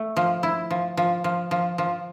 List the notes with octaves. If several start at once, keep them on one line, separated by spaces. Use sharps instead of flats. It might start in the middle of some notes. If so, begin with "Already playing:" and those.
Already playing: A3
F3
E4
F3
F3
F3
F3
F3